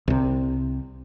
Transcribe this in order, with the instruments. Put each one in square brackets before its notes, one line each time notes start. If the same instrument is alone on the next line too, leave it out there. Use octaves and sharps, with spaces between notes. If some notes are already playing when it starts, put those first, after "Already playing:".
[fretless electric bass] C2 C3